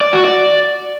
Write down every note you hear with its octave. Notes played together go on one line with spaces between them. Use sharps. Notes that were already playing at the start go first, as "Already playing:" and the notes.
D5
F#4
D5